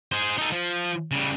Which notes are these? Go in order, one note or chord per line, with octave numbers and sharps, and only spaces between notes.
G#4 C5
D#4 A4
F3
C#3 G3